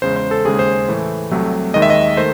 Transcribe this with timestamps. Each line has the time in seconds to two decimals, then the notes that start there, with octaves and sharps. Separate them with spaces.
0.02 E2 C#3 G#3 C5
0.16 C5
0.31 A4
0.45 D#2 C#3 G#3 G#4
0.59 C5
0.88 A2 E3 A3
1.31 C2 C3 F#3 A3
1.74 D#2 D#3 G#3 D#5
1.82 E5
1.90 D#5
2.17 D#3 A3 C5